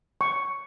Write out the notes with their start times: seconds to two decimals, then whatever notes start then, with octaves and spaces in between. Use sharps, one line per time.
0.21 C#6